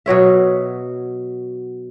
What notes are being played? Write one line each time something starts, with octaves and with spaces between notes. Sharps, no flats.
B2 F#3 C#5 E5